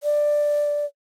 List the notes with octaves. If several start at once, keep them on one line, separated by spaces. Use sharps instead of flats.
D5